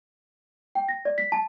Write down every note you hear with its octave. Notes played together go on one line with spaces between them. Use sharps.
G5
A#6
D5
B6
A5